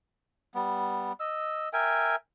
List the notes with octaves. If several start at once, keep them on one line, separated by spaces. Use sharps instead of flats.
G3 B3
D#5 E6
A#4 E5 G5 G#5